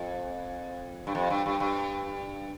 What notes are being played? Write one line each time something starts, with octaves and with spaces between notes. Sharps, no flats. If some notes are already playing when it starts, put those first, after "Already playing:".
Already playing: F2
G2
F2
G2
G2
G2